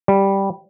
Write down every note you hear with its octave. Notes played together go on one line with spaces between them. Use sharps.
G3